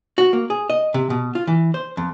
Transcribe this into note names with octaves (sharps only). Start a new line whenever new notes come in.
F#4
A#3
G#4
D#5
C3
B2
F4
E3
C5
F2